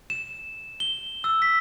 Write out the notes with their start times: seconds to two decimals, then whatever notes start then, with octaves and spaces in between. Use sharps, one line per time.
0.10 E7
0.80 G7
1.24 E6
1.42 B6